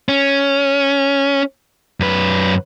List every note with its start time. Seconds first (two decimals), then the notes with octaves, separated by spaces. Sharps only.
0.09 C#4
2.00 F#2 B4